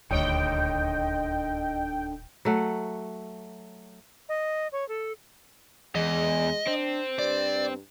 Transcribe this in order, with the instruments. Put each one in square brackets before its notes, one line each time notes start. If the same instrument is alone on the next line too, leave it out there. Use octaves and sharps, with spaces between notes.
[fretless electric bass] D#1 D2 [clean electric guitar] D3 D#4 C#5 [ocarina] D#5 [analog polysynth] G5
[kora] F#3 A3 F#5
[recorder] D#5
C#5
A4
[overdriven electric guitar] E2 [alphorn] G#3 [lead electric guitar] D#5
[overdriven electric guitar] C4 [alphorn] D4
[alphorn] G2 [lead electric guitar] D5